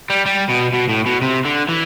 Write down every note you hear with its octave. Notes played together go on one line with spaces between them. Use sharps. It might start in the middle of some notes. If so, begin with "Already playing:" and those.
G3
G3
B2
B2
A2
B2
C3
D3
E3